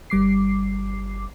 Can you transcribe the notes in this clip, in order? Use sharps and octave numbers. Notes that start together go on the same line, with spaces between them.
G1 G3 D6 C7